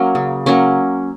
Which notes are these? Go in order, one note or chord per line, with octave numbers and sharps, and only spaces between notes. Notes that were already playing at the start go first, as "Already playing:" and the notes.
Already playing: F#3 A#3 C#4
C#3
F#3 A#3 C#4